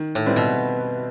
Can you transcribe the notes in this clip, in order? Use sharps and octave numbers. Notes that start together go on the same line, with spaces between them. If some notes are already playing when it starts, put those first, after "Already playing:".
Already playing: D#3
A2
G3 C4 E4 B4
B2